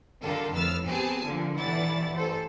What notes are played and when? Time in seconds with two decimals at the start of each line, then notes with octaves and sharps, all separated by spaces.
0.22 D3 D#3 G3 F4 A4 A#4
0.53 F2 A2 B4 E6 F6 A6
0.85 B3 C4 G4 G#4 G#5 A5
1.24 A#2 D3 F3 F4
1.57 G1 E3 E4 D5 F#5 A6
2.15 A1 A4 C5